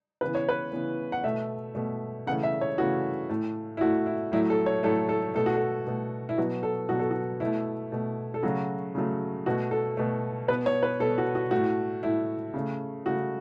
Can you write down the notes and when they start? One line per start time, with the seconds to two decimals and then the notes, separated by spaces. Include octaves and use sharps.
0.21 C#3 E3 B3 B4
0.35 C#5
0.49 B4
0.72 C#3 E3 B3
1.12 F#5
1.24 B2 A3 E5
1.75 B2 A3
2.27 C#3 E3 A3 F#5
2.43 E5
2.61 C#5
2.78 C#3 E3 A3 F#4
3.29 A2 A3
3.77 E4
3.81 A2 A3 F#4
4.06 E4
4.32 A2 F#3 A3 E4
4.50 A4
4.66 C#5
4.83 A2 F#3 A3 A4
5.09 A4
5.35 B2 A3 A4
5.46 F#4
5.56 A4
5.87 B2 A3
6.29 E4
6.37 B2 F#3 B3 F#4
6.63 A4
6.89 B2 F#3 B3 F#4
6.99 A4
7.11 F#4
7.40 B2 A3 E4
7.92 B2 A3
8.34 A4
8.43 C#3 F#3 A3 F#4
8.95 C#3 F#3 A3
9.46 B2 A3 F#4
9.71 A4
9.97 B2 A3
10.48 B2 B3 B4
10.66 C#5
10.83 B4
11.00 B2 B3 A4
11.18 F#4
11.35 F#4
11.51 A3 F#4
11.56 A2
12.03 A2 A3 E4
12.54 C#3 A3
13.06 C#3 A3 F#4